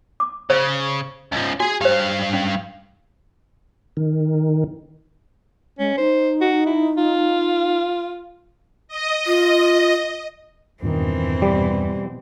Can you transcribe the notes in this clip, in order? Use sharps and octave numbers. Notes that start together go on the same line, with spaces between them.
D6
C#3 C5 F5
C#2 F3
F#4 G#4 G#5
G2 G4 C5 F5
C#4
D#3
G#3 C#4
D#4 C5
F#4
E4
F4
D#5
F4
E2 G2 A#2 D#3 E3 C4
B2 G3